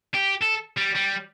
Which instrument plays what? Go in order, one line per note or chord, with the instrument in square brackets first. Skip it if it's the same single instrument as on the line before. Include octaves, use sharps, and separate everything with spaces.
[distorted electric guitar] G4
A4
G3
G3